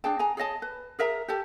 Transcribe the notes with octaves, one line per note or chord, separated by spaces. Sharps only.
D4 G#4 G5 A5
G#4 G#5 A#5
G#4 C#5 D#5 A5
B4
G#4 A#4 E5 A#5
G4 A4 A5